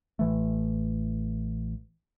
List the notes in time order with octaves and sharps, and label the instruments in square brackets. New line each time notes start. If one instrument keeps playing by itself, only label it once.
[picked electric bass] A1 E3 A3